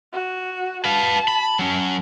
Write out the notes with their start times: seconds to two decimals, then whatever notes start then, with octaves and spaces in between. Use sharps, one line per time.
0.13 F#4
0.85 B4 F5 A5
1.28 B5
1.59 F#3 C#4